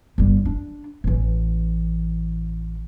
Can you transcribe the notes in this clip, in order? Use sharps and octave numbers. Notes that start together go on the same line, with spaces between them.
G1 G3
D4
A1 E3